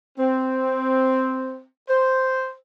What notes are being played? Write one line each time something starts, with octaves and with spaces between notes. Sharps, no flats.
C4
C5